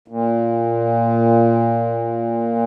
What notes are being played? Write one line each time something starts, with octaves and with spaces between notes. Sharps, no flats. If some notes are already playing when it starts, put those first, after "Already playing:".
A#2